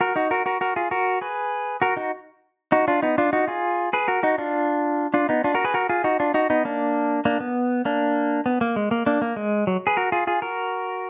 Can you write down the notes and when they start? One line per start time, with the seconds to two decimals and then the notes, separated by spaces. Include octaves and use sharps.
0.01 F#4 A#4
0.16 D#4 F#4
0.31 F#4 A#4
0.46 F#4 A#4
0.61 F#4 A#4
0.76 F4 G#4
0.91 F#4 A#4
1.21 G#4 B4
1.82 F#4 A#4
1.97 D#4 F#4
2.72 D#4 F#4
2.88 D4 F4
3.02 B3 D#4
3.18 D4 F4
3.33 D#4 F#4
3.48 F4 G#4
3.93 G#4 B4
4.08 F#4 A#4
4.23 D#4 F#4
4.38 D4 F4
5.14 D4 F4
5.29 B3 D#4
5.44 D4 F4
5.54 F#4 A#4
5.64 G#4 B4
5.74 F#4 A#4
5.89 F4 G#4
6.04 D#4 F#4
6.20 D4 F4
6.34 D#4 F#4
6.50 B3 D#4
6.65 A#3 D4
7.25 A#3 D4
7.40 B3
7.85 A#3 D4
8.46 B3
8.61 A#3
8.76 G#3
8.91 A#3
9.06 A#3 D4
9.22 A#3
9.36 G#3
9.67 F#3
9.87 G#4 B4
9.97 F#4 A#4
10.12 F4 G#4
10.27 F4 G#4
10.42 F#4 A#4